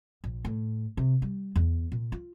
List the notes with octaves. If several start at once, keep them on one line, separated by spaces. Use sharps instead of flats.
A#1
A2
C3
G3
E2
A#2
F4